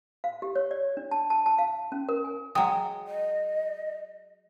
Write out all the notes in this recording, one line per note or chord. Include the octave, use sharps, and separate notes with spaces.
F5
G4
C#5
D5
D4
A5
A5
A5
F5
C#4
A#4
G#5
F#3 G#3 G5 D#6
D#5